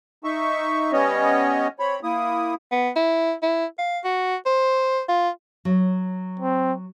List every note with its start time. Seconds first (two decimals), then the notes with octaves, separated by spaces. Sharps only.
0.24 D#4 E5 C#6
0.92 G3 B3 C#4 C#5 D#5
1.79 C4 C#5 B5
2.03 A#3 E4 D#6
2.71 B3
2.96 E4
3.42 E4
3.78 F5
4.04 F#4
4.46 C5
5.08 F4
5.65 F#3
6.40 C4